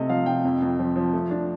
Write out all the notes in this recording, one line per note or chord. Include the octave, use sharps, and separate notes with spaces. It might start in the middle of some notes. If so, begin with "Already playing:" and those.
Already playing: C3 A3 D#5
F3 F5
C3 G5
F2
F2
F3
F3
A3
D4